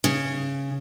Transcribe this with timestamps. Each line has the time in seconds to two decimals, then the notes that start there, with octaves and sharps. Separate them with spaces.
0.04 C#3